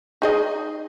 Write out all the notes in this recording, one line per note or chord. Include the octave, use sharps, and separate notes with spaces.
D#4 G#4 D#5